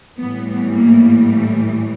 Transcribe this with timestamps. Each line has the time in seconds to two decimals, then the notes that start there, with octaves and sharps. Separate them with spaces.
0.17 A2 E3 G3 B3
0.73 A#3
1.29 A3